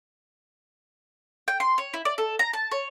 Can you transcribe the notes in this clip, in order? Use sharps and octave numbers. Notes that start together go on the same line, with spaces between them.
G5
C6
C#5
E4
D5
A4
A#5
A5
C#5